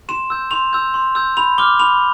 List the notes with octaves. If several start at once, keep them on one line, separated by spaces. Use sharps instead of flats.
C6 E7
E6 G6
C6 F7
E6 G6
C6
E6 G6
B5 F7
D6 F6 G7
B5 F7